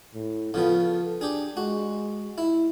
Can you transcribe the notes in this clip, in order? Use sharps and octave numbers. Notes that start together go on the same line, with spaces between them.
A2
C#3 F3 B3 A4
D4 G4 G#4
G#3 F#4
E4